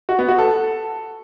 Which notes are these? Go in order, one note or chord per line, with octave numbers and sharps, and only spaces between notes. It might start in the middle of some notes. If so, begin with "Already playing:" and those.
F#4
B3
F#4
A4